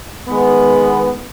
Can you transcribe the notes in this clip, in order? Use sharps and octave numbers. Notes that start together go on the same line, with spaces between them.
D#3 G#3 B3